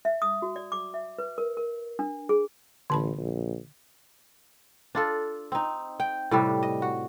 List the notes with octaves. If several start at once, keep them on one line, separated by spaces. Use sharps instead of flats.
E5
D#6
F#4
D5
D6
E5
B4
A#4
A#4
D4
G#4
A1 D3 A5 B5
A#1
D4 F4 A4
C4 D#4
G5
A2 C3 G3
D#5
F#4